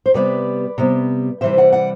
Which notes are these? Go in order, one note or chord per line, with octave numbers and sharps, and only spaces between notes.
C5
C3 G3 B3 B4 D5
C3 G3 B3
C3 E3 G3 C5 E5
D5 F#5
D5 F#5